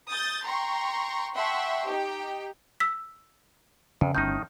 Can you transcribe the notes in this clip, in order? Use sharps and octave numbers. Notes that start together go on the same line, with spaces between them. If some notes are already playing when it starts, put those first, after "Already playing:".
D#6 G6 A6
G5 A#5 C6 C#6
E5 F#5 G5 A5 C6 C#6
D#4 G4 G5
E6 B6
F2 C#3
G1 A2 D#3 C#4 D#4 G6